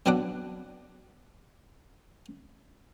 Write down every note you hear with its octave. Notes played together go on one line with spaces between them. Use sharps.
B2 F#3 B3 D4 F#5 D6